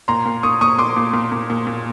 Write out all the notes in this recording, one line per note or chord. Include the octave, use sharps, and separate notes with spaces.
A#2 A#5 C6
A#2
A#2 C#6 D#6
A#2 C#6 D#6
A#2 C6 D6
A#2
A#2
A#2
A#2
A#2